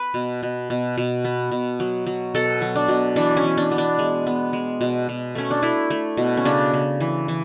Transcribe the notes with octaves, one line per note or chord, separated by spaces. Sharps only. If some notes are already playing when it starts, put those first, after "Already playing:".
Already playing: B4
B2
B2
B2
B2
B3
B2
F#3
F#3
B2 A4
F#3
D4
B2
E3 D4
C#4
E3
D4
B3
D4
G#3
B3
G#3
B2
B2
A3 C#4
D4
A3 E4
A3
B2
C#4
C#3 D4
C#3
E3
E3